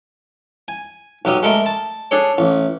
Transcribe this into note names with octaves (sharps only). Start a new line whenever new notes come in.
G#5
B1 F#3 G3 D#6
G#3 A3 A4 A#4 D#5
A5
D4 G#4 A4 C#5
A1